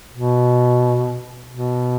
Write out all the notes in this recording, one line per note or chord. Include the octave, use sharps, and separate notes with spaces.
B2
B2